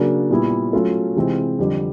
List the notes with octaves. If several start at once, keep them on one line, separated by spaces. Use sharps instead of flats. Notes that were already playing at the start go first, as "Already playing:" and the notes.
Already playing: C#3 F#3 A#3 D4
A#2 G3 B3 E4
F#3 A3 C#4 F4 A4
C3 E3 G#3 C4 F4
F2 D3 G3